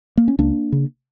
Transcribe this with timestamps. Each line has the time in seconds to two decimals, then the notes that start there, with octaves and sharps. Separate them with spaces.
0.17 A#3
0.28 C#4
0.39 C#2 A#3 D4
0.72 C#3